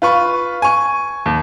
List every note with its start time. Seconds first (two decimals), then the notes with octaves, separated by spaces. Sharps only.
0.02 F4 B4 C#6
0.62 G#5 C#6
1.26 D#2